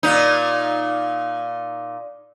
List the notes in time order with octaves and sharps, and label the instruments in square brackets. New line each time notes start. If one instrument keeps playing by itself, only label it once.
[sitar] A#2 D#4